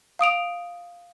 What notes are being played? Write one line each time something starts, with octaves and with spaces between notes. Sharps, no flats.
F5 D#6 D7 F7